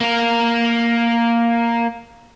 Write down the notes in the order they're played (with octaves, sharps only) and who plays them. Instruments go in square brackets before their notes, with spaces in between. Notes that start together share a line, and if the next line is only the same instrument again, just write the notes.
[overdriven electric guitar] A#3 A#4